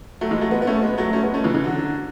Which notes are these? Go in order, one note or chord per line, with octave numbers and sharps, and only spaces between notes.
F#3 A3
E3 G#3
F#3 A3
G#3 B3
B3
A3 C#4
G#3 B3
F#3 A3
A3 C#4
G#3 B3
A3 C#4
C#3 E3
C#3 E3
D3 F#3